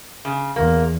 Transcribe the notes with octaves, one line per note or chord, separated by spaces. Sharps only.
C#3
E2 A#3